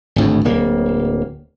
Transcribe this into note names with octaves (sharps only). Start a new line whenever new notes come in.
G#1 D2 A2
D1 A#3